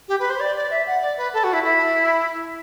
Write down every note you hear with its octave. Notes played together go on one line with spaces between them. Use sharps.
G4
B4
C5
D5
D5
E5
F#5
D5
B4
A4
F#4
E4
E4